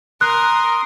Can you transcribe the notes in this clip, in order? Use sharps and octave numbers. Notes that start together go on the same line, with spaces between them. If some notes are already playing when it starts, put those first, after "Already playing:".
A#4 C6 D#6 F#6